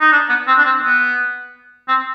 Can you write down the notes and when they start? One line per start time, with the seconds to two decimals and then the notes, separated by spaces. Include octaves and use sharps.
0.01 D#4
0.12 D4
0.29 B3
0.47 C4
0.58 D4
0.65 C4
0.83 B3
1.88 C4